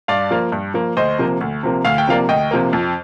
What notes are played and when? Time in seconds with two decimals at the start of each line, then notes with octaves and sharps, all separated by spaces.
0.08 G2 D5 F5
0.31 F3 A#3
0.52 G2
0.74 F3 A#3
0.97 D2 C5 D#5
1.18 C3 F3 A#3
1.41 D2
1.63 C3 F3 A#3
1.85 D2 F5
1.98 G5
2.07 C3 F3 A#3 D5 F5
2.29 D2 D#5 G5
2.51 C3 F3 A#3
2.73 F2